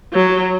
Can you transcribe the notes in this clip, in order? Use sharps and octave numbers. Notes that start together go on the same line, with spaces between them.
F#3